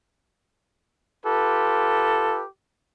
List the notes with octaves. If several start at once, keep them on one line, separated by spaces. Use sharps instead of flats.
F4 G4 A4 B4